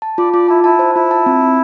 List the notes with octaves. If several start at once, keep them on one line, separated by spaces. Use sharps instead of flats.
A5
F4 D5
F4 D5
E4 A5
E4 A5
C5
E4 F4
A5
C4
C4